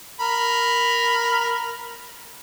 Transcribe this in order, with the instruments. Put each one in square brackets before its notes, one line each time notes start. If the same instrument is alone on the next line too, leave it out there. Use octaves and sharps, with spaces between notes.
[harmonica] A#4 B5